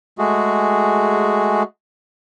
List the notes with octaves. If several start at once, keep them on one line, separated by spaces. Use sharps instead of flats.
G#3 A3 F#4 G#4